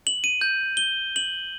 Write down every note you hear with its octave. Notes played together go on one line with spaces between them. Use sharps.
F#7
D#7
G6
G7
F#7